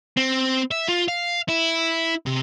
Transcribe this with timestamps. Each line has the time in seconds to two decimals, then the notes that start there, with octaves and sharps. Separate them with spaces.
0.17 C4
0.71 E5
0.88 F4
1.08 F5
1.48 E4
2.26 C3